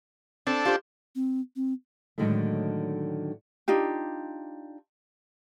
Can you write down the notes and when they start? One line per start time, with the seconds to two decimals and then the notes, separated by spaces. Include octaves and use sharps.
0.47 C4 D4 A4
0.65 F4 G4 C5
1.15 C4
1.56 C4
2.18 A2 D3 D#3 F#3 G#3 A3
3.68 D4 D#4 F4 G4